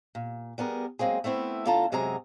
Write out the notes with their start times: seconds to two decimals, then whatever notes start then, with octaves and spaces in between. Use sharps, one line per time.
0.15 A#2
0.58 G3 B3 G#4 A#4
0.99 F#3 G#3 A#3 C4 G#4
1.24 A3 B3 C4 E4
1.66 D3 F4 A4 A5 A#5
1.92 F#2 C3 F#3 G#3 G#4 A#5